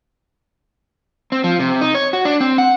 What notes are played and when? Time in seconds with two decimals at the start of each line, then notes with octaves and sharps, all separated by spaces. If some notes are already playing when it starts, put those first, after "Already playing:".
1.32 C4
1.44 F3
1.60 C3
1.81 D#4
1.95 C#5
2.13 F#4
2.25 D4
2.40 C4
2.58 F#5